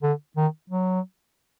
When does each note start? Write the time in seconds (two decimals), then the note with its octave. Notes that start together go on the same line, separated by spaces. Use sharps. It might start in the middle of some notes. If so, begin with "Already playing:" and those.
0.03 D3
0.37 D#3
0.70 F#3